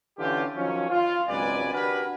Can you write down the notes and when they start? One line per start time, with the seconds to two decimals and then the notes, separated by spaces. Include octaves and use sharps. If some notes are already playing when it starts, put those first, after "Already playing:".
0.18 D3 E3 C#4 F4 G4
0.56 D#3 F3 F#3 C#4
0.90 F4
1.28 G#1 C#2 F#3 B4 D5 G#5
1.73 D4 F#4 G4 A#4 B4